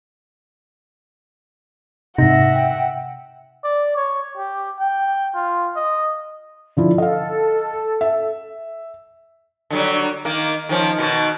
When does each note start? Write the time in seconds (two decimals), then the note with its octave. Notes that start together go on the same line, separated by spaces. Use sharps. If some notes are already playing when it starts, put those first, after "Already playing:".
2.18 G#2 C3 D#4 E5 F#5 A#6
2.54 G5
3.64 D5
3.96 C#5
4.37 G4
4.79 G5
5.35 F4
5.76 D#5
6.77 D3 F3 E4
6.98 A4 D#5 F5
8.01 E5
9.70 D3 F#3 G3
10.25 D#3 A#3
10.69 D#3 F3 C#4
10.98 B2 D#3